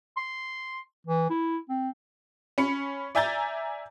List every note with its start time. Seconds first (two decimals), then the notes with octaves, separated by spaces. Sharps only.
0.17 C6
1.07 E3
1.30 E4
1.69 C4
2.58 C#4 B5 C#7
3.15 D5 E5 G#5 A#5 G6 A6